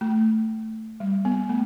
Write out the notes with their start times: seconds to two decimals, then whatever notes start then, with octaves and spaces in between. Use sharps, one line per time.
0.01 A3
1.00 G3
1.25 B3
1.49 A3